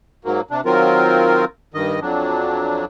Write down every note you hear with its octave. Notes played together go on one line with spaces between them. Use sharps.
G#2 F#3 A#3
C3 D4
D#3 F#3 C4 F4 A#4
G2 D#3 D#5
F2 F#3 D4